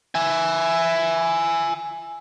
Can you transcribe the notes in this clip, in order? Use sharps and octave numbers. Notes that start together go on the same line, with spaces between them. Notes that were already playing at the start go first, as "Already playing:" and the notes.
E5 G#5